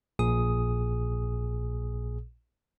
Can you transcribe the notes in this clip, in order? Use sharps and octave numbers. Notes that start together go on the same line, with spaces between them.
A#1 A#2 G#4 D#6